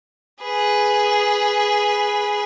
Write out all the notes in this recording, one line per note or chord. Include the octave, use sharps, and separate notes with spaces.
G#4 B4